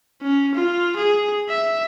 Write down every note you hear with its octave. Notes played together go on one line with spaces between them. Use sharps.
C#4
F4
G#4
E5